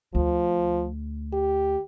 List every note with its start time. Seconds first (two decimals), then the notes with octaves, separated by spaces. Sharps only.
0.15 D2 F3
1.33 G4